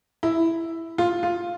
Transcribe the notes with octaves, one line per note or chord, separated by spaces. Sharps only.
E4
F4
F4